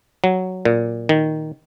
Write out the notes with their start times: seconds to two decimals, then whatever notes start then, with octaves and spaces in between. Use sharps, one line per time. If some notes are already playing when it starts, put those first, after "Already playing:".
0.24 F#3
0.65 A#2
1.09 D#3